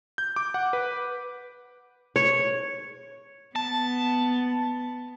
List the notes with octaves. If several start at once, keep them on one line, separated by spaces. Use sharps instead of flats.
G6
D6
F#5
B4
C#5
B3 A5